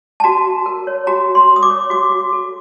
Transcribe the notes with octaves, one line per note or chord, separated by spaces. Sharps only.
A5
F#4 A#5
F#4
A#4
C#5
F#4 A#5
F#4
C6
A#4
D#6
D6
C#5
F#4 D6
F#4
A4